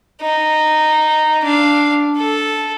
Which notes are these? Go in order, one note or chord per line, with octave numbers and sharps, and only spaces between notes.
D#4
D4 F5
A4